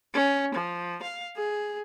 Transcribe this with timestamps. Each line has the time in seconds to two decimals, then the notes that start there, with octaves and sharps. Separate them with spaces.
0.14 C#4
0.54 F3
1.02 F5
1.36 G#4